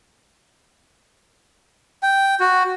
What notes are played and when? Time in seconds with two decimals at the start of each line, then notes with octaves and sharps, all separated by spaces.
2.03 G5
2.40 F#4